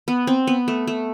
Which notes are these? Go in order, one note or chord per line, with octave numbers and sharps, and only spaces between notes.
B3
C4
B3
A3
A3